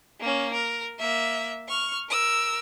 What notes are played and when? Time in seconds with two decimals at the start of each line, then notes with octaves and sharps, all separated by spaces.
0.20 A#3 C#4
0.54 A#4
0.99 A#3 E5
1.69 C#6 F6
2.10 A#4 E6